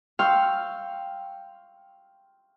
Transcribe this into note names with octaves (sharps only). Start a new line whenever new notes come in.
F5 G5 C6 C#6 E6 F6